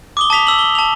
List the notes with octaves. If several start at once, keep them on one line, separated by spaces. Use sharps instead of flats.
D6 D#6 G7
A5 D#6 B6 F7
E6 F#7
G7
A5 F7